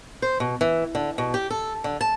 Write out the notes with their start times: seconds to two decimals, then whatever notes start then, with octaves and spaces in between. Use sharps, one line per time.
0.22 C5
0.40 B2
0.61 E3
0.95 D3
1.18 B2
1.34 G4
1.50 A4
1.84 D3
2.01 A5